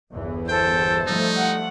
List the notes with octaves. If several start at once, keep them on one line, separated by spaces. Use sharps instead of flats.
G1 E2 E3
A4 C5 G5
F3 G3 A3 D#4
F#5